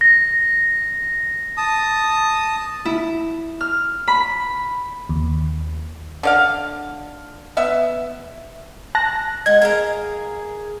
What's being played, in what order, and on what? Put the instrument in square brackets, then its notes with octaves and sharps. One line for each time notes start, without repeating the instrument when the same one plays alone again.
[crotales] A#6
[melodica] A5 D#6
[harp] E4
F6
B5
[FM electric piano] D#2
[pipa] D3 D5 F5
B3 E5
[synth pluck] A5 F#6 A#6
[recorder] G#3 [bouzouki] D#5 F#5 [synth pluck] G#6
[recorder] G#4 [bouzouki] A#4 F5 A#5